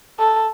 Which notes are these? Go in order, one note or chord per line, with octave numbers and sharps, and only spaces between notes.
A4